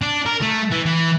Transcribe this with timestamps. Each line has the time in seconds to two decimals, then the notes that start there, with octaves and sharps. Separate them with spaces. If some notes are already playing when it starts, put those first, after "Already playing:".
0.02 D4
0.26 A#4
0.42 A3
0.72 E3
0.86 E3